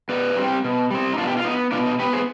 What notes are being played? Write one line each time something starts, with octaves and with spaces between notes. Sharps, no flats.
B2 B4 D5
G3 C4
B2
G3 C4
D#4
B2 D4 F4
G4
F4
B3 D#4
B2 D4 F4
D#4
B3 G4 B4
G#4 C5